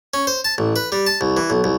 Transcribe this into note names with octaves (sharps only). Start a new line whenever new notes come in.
C#4
C5
A5
A1
B4
G3
A5
C2
E3
B1
C2